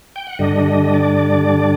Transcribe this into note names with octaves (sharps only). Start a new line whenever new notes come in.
G5
F#5
G2 D3 G3 D4 D#5
D#5
D#5
D5